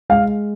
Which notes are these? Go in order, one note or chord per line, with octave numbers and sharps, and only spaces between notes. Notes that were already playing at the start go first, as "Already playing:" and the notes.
G#3 F5